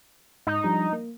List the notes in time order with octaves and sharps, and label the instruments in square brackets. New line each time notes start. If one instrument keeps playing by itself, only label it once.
[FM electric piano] G#2 [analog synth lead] D#4
[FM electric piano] F3 G3 D4
A#3